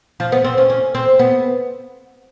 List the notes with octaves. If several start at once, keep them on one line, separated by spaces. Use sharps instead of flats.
F3
B3
C4
C#4
C#4
C4
B3